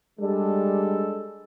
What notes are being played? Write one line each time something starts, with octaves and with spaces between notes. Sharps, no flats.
G3 G#3 D4 A4